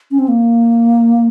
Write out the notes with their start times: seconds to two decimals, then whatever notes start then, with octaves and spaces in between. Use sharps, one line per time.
0.11 C#4
0.19 C4
0.28 A#3